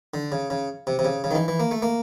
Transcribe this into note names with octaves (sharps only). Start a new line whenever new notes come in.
D3
C#3
C#3
C3
C3
C#3
C#3
D#3
E3
E3
A#3
A3
A#3